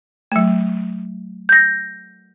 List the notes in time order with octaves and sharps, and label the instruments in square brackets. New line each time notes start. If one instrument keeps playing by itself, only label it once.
[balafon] F#3 A3
[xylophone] G6 A#6